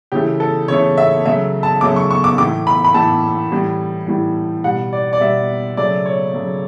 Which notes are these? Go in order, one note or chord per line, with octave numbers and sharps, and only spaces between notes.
C#3 E3 A3 G4
A4
C#3 E3 A3 C#5
E5
C#3 F#3 A3 E5
A5
C#3 F#3 A3 D6
C#6
C#6
D6
A2 E3 A3 D6
B5
B5
A2 E3 A3 A5
A2 E3 G3
A2 E3 G3
B2 G3 F#5
D5
D5
B2 G3 E5
C#3 F#3 A3 D5
C#5
C#3 F#3 A3